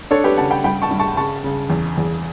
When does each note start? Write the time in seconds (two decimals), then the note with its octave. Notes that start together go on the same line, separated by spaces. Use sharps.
0.11 D4 A4 C#5
0.24 G4 B4
0.37 C#3 F#5 A5
0.50 G5 B5
0.64 G2 G5 B5
0.82 A5 C#6
0.91 G2
0.99 A5 C#6
1.17 C#3 A5 C#6
1.44 C#3
1.70 E2
1.97 E2